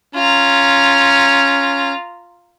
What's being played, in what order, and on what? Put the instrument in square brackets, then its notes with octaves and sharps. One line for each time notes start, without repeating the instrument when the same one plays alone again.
[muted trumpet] C#4 [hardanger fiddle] F4 A#5